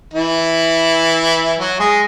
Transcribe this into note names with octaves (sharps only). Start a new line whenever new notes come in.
E3 E4
F#3 F#4
G#3 G#4